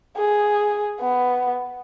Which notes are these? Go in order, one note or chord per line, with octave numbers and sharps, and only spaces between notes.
G#4
B3